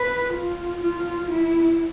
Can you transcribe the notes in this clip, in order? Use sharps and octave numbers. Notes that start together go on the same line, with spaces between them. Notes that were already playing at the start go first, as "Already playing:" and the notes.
Already playing: B4
F4
F4
E4